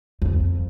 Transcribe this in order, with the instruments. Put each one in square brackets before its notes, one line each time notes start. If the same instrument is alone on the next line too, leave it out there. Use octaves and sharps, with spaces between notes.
[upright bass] F2